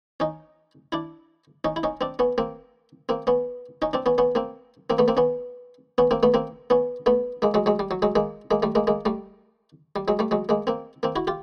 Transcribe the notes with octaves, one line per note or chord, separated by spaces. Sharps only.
C#4 D#4
D4 E4
C#4 D#4
E4
C#4 D#4
C4 D4
B3 C#4
A#3 C4
A#3 C4
B3 C#4
C#4 D#4
C4 D4
B3 C#4
B3 C#4
A#3 C4
A#3 C4
A3 B3
A#3 C4
B3 C#4
B3 C#4
A#3 C4
A3 B3
A#3 C4
B3 C#4
A3 B3
G#3 A#3
F#3 G#3
F#3 G#3
G3
F#3
F#3 G#3
G#3 A#3
G#3 A#3
G3 A3
G#3 A#3
G#3 A#3
G3 A3
G3
F#3 G#3
G3 A3
F#3 G#3
G#3 A#3
A#3 C4
A#3 C4
E4 F#4
F4 G4